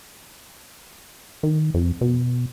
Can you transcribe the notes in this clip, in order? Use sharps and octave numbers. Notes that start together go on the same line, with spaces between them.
D#3
F2
B2